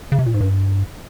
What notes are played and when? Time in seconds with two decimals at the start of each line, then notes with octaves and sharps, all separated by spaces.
0.12 C#3
0.19 C3
0.26 A#2
0.34 G#2
0.40 G2